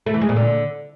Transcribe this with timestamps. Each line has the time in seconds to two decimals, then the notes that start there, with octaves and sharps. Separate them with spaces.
0.06 A3
0.14 E3
0.21 G#3
0.29 A#2
0.36 D3